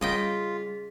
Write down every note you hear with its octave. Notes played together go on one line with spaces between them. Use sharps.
C#3 G3 F4 G#4 D#5 G5 B6